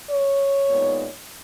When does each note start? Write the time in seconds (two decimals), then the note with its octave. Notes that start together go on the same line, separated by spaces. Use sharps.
0.11 C#5
0.68 A#2 G#3 B3 D#4